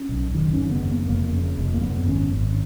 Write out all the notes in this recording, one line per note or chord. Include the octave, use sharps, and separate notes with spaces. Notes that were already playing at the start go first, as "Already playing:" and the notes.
Already playing: C#4
B1
F#1 D#3
C#3 C#4
B3
F#2
A#3
F1 A#3
C#3
F1
A#3
F#2 B3
G#1 C#4
G#1